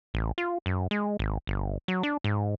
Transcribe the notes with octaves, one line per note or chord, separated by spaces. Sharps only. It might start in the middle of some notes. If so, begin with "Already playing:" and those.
A1
F4
F#2
G#3
G#1
G1
F#3
D4
G#2